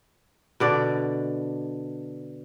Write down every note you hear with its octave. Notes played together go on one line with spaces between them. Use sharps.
B2 D3 D5